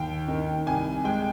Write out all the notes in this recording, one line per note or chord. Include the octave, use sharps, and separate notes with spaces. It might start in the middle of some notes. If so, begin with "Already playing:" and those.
Already playing: D#2 G5
D#3
C2 G#5
G#3 G5